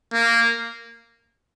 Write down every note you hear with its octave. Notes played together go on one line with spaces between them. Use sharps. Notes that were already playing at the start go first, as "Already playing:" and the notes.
A#3